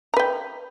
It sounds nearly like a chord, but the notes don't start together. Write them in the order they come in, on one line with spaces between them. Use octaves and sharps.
A#5 B4 G5